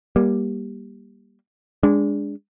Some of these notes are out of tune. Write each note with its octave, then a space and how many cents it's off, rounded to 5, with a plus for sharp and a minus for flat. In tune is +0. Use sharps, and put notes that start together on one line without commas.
G3 +0 A#3 +25
G#3 -15 D4 -15